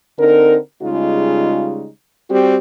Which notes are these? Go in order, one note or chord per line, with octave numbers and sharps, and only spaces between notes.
D3 C4 D#4 A#4
C#3 G3 G#3 D#4 F4
G3 C4 F#4 G4